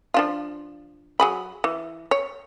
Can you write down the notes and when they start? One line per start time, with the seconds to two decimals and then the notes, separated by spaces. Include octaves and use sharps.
0.14 F3 D4 F4
1.20 F#3 G#4 B5
1.64 E3
2.11 C#5